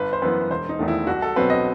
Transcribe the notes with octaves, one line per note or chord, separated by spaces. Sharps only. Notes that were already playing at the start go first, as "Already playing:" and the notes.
Already playing: G1 B4
C5
F#2 E3 B3 B4
E1 C5
D#4
E2 D#3 A3
E4
C2 F#4
A4
B2 F#3 C4 B4
D#5